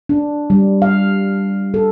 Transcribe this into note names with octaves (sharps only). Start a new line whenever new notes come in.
D4
G3
F5
A4